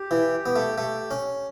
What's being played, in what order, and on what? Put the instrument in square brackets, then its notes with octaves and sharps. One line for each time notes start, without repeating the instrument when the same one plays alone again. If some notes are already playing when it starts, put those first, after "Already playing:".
Already playing: [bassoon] G4
[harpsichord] E3
B3
A3
A3
C#4